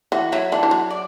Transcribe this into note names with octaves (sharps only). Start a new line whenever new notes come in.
E3 F#4
F#3 E4
E3 D4
E3
F#3
D5